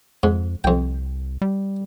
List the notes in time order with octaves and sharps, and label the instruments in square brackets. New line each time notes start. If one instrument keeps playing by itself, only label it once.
[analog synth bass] F2 [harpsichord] G#2
[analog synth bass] C2 [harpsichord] F2 G5
[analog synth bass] G3